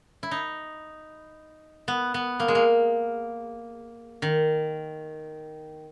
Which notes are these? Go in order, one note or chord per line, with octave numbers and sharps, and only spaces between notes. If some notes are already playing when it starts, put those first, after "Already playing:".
E4
D#4
B3
B3
A#3
G#3
A#3
D#3